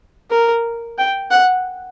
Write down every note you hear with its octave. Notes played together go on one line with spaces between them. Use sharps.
A#4
G5
F#5